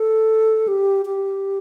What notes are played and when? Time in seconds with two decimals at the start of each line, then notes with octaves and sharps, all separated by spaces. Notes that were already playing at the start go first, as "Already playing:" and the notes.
Already playing: A4
0.68 G4
1.06 G4